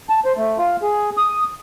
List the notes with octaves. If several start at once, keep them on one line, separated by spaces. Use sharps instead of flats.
A5
C5
A3
F4
G#4
D#6